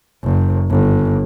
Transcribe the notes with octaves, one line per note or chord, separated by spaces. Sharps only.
F#1
G1